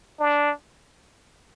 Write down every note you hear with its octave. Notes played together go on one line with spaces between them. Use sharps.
D4